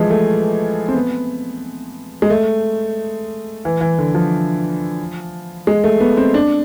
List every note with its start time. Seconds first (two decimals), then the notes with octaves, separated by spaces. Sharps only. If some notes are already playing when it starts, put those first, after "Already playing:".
Already playing: E3 F3 G#3
0.10 A3
0.88 C4
0.94 B3
2.22 G#3
2.30 A3
3.65 E3
3.81 E3
3.99 D3
4.15 F3
5.67 G#3
5.84 A3
6.00 B3
6.17 C4
6.34 D4